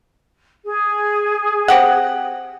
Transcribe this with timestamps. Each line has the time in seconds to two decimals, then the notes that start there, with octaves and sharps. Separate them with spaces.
0.65 G#4
1.68 C4 G4 F#5